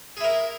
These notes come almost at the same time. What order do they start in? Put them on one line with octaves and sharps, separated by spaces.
G#4 E4 A#4